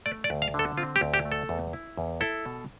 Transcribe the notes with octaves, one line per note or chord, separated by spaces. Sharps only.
A3 D5
D5
D2
F5
D3
A4
C4 F4
G4
D2
G4
A3
A4
E2
E4
E2
E4 A4
B2